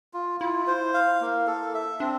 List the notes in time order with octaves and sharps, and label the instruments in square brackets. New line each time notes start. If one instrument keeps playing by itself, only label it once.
[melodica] F4
[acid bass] E4 [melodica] F4
[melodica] C5
F5
A#3
A4
E5
[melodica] C4 [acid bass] D4